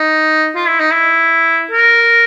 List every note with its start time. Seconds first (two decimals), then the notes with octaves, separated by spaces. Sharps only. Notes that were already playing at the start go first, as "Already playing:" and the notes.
Already playing: D#4
0.55 F4
0.68 E4
0.80 D#4
0.92 E4
1.71 A#4